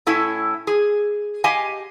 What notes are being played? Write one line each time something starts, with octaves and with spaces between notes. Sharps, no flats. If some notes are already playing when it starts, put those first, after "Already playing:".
A2 C#4 E4 A4
G#4
G4 D#5 F5 G#5